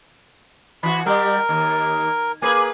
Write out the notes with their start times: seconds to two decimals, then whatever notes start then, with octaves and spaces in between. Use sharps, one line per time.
0.83 E3 F#4 B5
1.06 G3 G4 A#4
1.49 D#2
2.42 A#3 G#4 B4 G#5